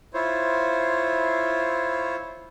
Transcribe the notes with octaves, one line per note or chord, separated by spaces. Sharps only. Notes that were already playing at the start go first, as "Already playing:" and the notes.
E4 F4 C5 C#5